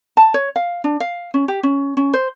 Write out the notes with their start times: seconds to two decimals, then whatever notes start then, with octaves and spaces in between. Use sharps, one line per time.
0.17 A5
0.34 C#5
0.56 F5
0.84 D4
1.00 F5
1.34 C#4
1.48 G4
1.63 C#4
1.97 C#4
2.13 C5